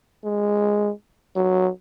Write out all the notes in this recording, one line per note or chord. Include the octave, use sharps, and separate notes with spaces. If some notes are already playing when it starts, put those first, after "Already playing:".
G#3
F#3